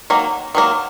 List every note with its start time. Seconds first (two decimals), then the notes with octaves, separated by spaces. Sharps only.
0.10 D#3 F#3 A#3
0.55 D#3 F#3 A#3